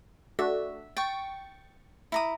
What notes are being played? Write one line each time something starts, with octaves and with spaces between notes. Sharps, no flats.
A3 D4 F#4 E5
G5 C#6 A6
E4 A#5 D#6